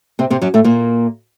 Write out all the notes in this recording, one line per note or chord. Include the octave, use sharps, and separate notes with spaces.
C3 C4
C3 C4
F#2 F#3
A2 A3
A#2 A#3